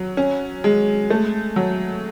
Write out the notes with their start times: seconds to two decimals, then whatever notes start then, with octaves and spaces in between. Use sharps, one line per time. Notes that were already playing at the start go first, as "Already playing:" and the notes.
Already playing: F#3
0.17 C#4
0.64 G#3
1.10 A3
1.56 F#3